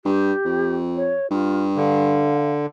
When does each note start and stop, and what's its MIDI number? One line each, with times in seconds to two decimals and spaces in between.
0.05 0.33 43
0.05 0.76 67
0.45 1.15 41
0.96 1.30 73
1.31 2.40 43
1.31 1.64 65
1.77 2.66 50
1.77 2.52 77